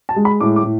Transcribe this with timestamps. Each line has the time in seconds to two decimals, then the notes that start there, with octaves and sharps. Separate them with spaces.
0.09 A5
0.16 G#3
0.25 B5
0.40 A2 D6
0.56 D6
0.64 A2